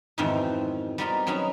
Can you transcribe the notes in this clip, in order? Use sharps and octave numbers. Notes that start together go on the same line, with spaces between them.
F2 G#2 B2 D#3 E3 C4
G3 B3 C4 D#4 A#4 C6
F#3 B3 C#4 D#4 G#4